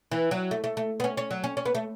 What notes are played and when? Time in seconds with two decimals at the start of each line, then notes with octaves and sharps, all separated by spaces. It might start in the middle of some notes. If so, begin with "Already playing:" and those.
0.12 E3
0.31 F#3
0.51 A3
0.64 A3
0.77 A3
1.00 B3
1.04 C#4
1.17 C#4
1.31 F#3
1.44 C#4
1.57 C#4
1.66 B3
1.75 A3